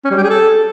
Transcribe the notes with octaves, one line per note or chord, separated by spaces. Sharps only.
C#4
G3
G4
G#4
A4